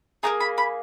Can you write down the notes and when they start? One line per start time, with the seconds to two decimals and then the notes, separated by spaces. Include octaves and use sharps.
0.23 A#3 D#4 G#4 A#5
0.40 B5
0.58 B5